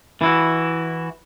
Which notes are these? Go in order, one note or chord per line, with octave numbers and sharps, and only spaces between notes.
E3 E4 F#4